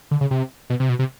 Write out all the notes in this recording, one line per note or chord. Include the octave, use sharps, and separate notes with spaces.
D3
C#3
C3
B2
C3
B2
C3